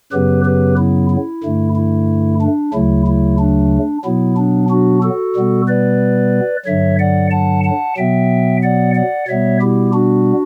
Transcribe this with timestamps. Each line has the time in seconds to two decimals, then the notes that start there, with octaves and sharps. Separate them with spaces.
0.11 F#2 C#3 F#3 B3 G4 B4
0.45 G4 B4
0.77 E4
1.10 E4
1.43 G2 D3 A3
1.76 E4
2.41 D4
2.74 D2 C#3 F#3 A3 E4
3.06 E4
3.39 D4
4.05 B2 F#3 B3 E4
4.37 D4
4.70 D4 F#4
5.03 F#4 A4
5.35 B2 G3 B3
5.68 B4 D5
6.66 G2 D3 F#3 C#5 E5
6.99 D5 F#5
7.31 F#5 A5
7.64 F#5 A5
7.97 B2 F#3 B3 E5 G5
8.63 D5 F#5
8.95 D5 F#5
9.28 B2 G3 B3 C#5 E5
9.61 E4 G4
9.94 D4 F#4